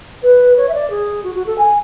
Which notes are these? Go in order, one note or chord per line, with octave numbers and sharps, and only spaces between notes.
B4
C#5
E5
D5
G#4
F#4
F#4
A4
G#5